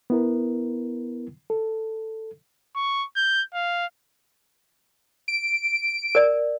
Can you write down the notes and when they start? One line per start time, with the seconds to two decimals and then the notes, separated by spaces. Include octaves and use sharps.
0.10 B3 E4 A#4
1.50 A4
2.76 C#6
3.16 G6
3.54 F5
5.28 D7
6.15 A#4 D5